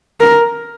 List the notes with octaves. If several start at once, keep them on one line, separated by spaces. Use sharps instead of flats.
A#4